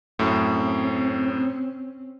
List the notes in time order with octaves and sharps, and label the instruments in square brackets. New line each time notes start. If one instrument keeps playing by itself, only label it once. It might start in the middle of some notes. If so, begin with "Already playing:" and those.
[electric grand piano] F#2 A2 [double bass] C4 C#4